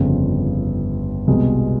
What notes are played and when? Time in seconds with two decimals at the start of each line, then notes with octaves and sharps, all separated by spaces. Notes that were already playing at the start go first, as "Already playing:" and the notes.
Already playing: G1 F2 C#3
1.27 C2 B2 G#3